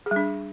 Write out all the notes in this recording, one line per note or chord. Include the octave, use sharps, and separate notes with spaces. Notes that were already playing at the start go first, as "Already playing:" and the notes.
G#4
G3
D4